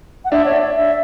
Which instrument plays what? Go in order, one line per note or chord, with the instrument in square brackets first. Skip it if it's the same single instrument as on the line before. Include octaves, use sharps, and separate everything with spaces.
[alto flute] F#5
[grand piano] D4 [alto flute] E5
[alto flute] C#5
D5
E5